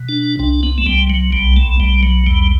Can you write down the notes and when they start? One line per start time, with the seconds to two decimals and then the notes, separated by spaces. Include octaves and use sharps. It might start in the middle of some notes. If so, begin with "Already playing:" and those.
Already playing: B2
0.09 D4
0.39 C2 D4
0.63 B3
0.78 A3
0.86 C2 G3
1.10 F#3
1.33 B1 G3
1.56 A3
1.80 B1 G3
2.03 F#3
2.26 E2 G3